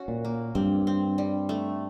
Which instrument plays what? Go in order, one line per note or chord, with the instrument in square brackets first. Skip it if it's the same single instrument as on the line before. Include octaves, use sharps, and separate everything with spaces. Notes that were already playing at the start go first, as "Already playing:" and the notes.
Already playing: [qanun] C#4 F#4
[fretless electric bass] A#2
[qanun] A#3
[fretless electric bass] G2 [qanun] C4
[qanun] C4
G3
A3